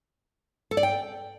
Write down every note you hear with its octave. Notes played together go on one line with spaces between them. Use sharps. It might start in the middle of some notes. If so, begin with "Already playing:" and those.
A4
D5
G5